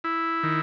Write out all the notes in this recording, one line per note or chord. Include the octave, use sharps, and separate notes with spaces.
E4
D#3